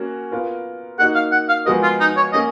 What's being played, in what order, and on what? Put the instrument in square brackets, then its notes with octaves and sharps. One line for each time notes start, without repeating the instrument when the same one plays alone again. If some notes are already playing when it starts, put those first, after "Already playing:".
Already playing: [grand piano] A#3 C#4 F#4
B3 F4 A#4
[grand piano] A#3 D#4 F#4 [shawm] F#5
[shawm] F5
F#5
F5
[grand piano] F3 G#3 B3 F#4 A#4 [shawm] D#5
[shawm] F4
D#4
C#5
[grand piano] A#3 C#4 [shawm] D#5